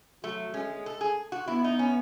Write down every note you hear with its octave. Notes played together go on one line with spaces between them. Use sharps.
F#3 A3
G#3 C#4
A4
G#4
F#4
B3 E4
D#4
C#4